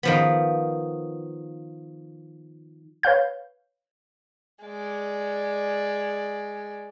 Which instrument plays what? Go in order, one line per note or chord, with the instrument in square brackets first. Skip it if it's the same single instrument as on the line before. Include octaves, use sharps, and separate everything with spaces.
[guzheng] D#3 F3 B3
[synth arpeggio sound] B4 C#5 F5 G6
[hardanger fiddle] G#3 D5